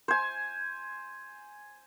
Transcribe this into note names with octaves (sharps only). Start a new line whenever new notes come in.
C5 G#5